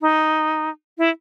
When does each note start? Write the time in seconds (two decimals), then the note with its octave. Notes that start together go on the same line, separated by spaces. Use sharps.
0.02 D#4
0.98 E4